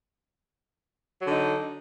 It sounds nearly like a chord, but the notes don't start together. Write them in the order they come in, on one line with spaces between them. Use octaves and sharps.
F#3 D3 D#4